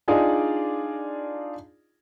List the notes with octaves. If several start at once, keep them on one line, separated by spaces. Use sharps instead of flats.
D4 D#4 F4 G#4 D5 D#5